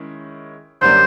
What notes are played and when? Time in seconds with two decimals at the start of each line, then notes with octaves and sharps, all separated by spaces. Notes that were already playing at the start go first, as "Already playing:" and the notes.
Already playing: D#3 G#3 C#4 E4
0.81 F#2 D3 G3 A#3 D4 C5